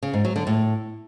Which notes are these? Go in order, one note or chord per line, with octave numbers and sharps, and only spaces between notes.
C#3
G#2
F#3
D3
A2